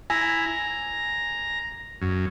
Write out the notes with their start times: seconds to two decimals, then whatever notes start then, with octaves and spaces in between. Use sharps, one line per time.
0.10 E4 G#5 A#5
0.48 A#5
2.02 F#2